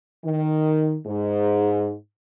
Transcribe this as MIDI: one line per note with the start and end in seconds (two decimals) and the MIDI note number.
0.25 0.96 51
1.06 1.95 44